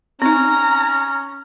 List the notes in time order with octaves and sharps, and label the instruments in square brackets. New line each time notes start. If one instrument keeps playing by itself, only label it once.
[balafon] C4 D#4 [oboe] C#4 [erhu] A#5